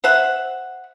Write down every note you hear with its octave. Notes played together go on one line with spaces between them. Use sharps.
C5 E5 F#5